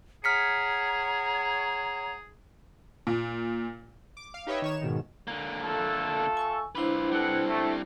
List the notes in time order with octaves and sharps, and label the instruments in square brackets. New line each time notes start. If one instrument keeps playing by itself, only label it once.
[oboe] G#4 [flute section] C#5 F#5 A#5 [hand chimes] F6 B6 C#7
[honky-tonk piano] A#2
[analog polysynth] D6
F5
D#4 G4 B4 C#5 D#5 E5
D#3 C#5 E7
G#2 B2 D#3
[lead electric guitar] D3 A#3
[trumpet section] A3 F4 A4
[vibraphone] G#5 C#6 E6
[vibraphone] D4 E4 C5 [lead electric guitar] F4 B4
[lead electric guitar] G3 C4 [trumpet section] A4 B4 F#5
[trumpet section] A3